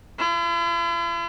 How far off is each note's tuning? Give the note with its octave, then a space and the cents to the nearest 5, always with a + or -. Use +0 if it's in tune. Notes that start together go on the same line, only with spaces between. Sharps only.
E4 +45